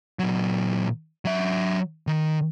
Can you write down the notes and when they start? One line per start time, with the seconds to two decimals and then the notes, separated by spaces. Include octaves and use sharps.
0.19 A#2 F#3
1.25 F#3 E5
2.07 D#3